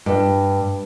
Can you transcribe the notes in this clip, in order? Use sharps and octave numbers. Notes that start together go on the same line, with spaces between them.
G2